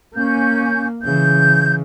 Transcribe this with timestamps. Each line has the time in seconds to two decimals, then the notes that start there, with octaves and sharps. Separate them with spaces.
0.14 A#3 C#4 G6
1.02 C#3 E3 G6